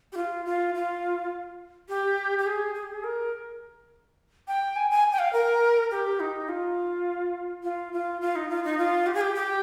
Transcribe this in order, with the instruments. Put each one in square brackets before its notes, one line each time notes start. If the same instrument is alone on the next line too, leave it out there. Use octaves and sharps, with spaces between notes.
[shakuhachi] G4
F4
F4
F4
G4
G4
G#4
G#4
G4
G#4
A#4
G5
G#5
G#5
G5
F5
A#4
G4
D#4
F4
F4
F4
F4
D#4
F4
D#4
F4
G4
G#4
G4
G4